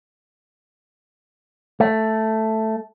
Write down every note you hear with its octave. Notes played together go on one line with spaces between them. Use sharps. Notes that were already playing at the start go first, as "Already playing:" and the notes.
A3